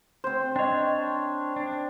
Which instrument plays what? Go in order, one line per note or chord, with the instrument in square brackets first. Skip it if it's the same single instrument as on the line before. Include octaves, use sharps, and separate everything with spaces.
[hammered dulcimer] C4 C5
[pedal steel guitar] D4 C#5 [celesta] D#5 G5
[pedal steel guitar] D4